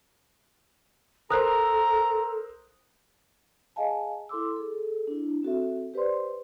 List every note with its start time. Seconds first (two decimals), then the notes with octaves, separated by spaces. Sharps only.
1.30 A4 A#4 C5 A#5 D#6 F#6
3.76 G#4 D#5 F5 G#5 A5
4.29 E4 A4 C6 D6 E6
4.56 G#4 A4
5.07 D4 E4
5.43 C4 F#4 A4 E5
5.94 G4 B4 C5 D5 C6